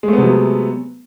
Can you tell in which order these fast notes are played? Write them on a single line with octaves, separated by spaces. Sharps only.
G#3 A3 B3 C3 F#3